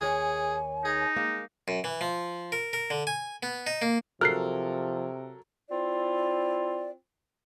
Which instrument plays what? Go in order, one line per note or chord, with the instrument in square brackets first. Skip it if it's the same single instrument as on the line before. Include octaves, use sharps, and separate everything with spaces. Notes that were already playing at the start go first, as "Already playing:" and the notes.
[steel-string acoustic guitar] D#2 C#5 [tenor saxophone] G#4 [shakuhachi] G#5
[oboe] D#4 [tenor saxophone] G#4
[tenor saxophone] G#3 [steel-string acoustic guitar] A#3 F5
[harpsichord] F#2
E3
F3
A#4
A#4
D3
G#5
B3
D#4
A#3
[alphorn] C3 [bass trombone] F3 [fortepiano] F#3 A4 A#4 [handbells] F6 F#6 C7
[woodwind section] C4 E4 F4 D5